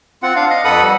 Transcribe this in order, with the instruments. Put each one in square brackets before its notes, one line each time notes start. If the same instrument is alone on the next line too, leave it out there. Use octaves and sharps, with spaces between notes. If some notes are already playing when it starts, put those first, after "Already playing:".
[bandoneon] C4 F4 F#5
D4 F5
D#5 F5
F2 A4 B4 F#5 B5 D#6
G3